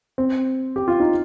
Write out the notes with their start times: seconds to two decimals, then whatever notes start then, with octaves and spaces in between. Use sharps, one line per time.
0.18 C4
0.76 G4
0.88 F4
1.00 D#4